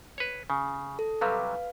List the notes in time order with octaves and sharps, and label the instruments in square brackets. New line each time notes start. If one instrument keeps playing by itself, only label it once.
[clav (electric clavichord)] B4 C#5
C#3
[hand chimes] A4
[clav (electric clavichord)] C3 F#3 G3 [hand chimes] B4 F5